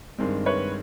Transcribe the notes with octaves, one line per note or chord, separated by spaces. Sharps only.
G2 D#3 G#3 C4
B4 C#5